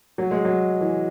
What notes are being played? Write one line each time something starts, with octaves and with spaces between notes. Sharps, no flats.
F#3
G#3
F#3
E3